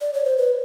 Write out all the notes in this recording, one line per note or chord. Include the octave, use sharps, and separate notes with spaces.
D5
C#5
C5
B4